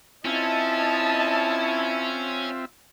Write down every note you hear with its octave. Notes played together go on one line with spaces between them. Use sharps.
C4 C#4 E4 F4 D#5 E5 A5